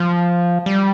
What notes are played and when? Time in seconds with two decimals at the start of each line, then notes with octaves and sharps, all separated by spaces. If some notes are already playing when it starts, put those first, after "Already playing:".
Already playing: F3
0.66 G3